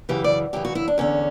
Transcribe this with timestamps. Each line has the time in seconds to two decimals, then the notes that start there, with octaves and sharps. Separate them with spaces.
0.09 F#2 C#3 E3 G4
0.24 D5
0.53 F#2 C#3 E3 G4
0.65 F#4
0.75 E4
0.88 D4
0.98 E2 D3 C#4